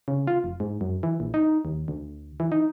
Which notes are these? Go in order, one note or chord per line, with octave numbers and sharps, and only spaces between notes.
C#3
F4
F1
G#2
F#2
E3
A#1
D#4
D#2
D2
E3
D#4